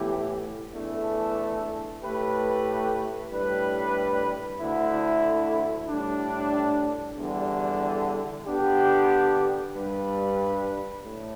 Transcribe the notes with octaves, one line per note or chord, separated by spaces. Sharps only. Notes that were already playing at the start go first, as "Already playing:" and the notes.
Already playing: A2 E3 B3 G4
E2 E3 A3 D4 A4
A2 A3 G4 B4
A2 G3 D4 B4
D2 D3 A3 E4
A2 G3 D4
E2 D3 G3
D3 B3 D4 G4
G2 G3 D4 B4
A2